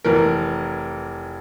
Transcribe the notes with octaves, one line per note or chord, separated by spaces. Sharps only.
F1 E3 A#4